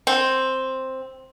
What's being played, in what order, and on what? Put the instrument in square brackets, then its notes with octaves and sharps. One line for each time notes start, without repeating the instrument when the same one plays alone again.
[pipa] C4